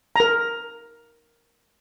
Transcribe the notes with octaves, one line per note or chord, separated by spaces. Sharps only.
A#4 A#5